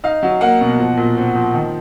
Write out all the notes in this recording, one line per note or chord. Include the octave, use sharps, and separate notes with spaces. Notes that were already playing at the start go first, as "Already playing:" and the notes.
D#4 F5
F#3
A#3 F#5
B2
F3
A#2
C4
F3
D#3